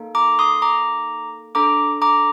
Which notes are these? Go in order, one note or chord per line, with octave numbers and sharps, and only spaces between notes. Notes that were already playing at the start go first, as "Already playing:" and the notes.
Already playing: A#3 D#4 A4
A#5 D6
C6 D#6
A#5 D6
D4 A4 A#5 D6
A#5 D6